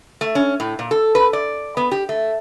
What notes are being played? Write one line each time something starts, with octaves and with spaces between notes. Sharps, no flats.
A3
C#4
A2
A#2
A4
B4
D5
B3
G4
A3